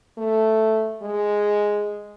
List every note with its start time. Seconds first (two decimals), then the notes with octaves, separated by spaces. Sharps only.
0.18 A3
1.02 G#3